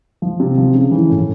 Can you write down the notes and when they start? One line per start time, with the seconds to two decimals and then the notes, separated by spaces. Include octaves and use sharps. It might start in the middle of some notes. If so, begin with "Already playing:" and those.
0.22 F3
0.40 C3
0.58 F3
0.74 C#3
0.91 E3
1.10 A2